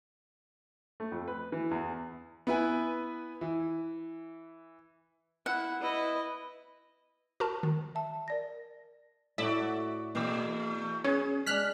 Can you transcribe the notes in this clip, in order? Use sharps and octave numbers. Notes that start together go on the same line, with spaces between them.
A3
F2
B4
E3
E2
B3 E4 B4 G#5
E3
E4 F#5
E4 B4 D#5
F#4 A#4 A5
D#3
E5 A5
A#4 D5 A#6
A2 E4 F#4 D5 E5
E2 B2 A3
C#4 G#4 B4
G#3 D4 F6 F#6 B6